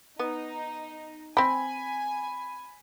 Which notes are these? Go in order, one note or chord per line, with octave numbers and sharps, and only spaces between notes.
B3 D#4
C4 G5 G#5 B5